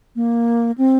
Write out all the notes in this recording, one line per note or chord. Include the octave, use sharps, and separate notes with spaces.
A#3
C4